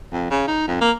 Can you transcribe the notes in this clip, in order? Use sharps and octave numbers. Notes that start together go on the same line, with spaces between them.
F2
C#3
D#4
F2
A#3